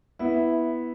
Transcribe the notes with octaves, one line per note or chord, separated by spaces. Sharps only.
B3 E4 E5